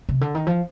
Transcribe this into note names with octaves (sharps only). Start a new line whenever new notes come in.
C3
D3
D#3
F3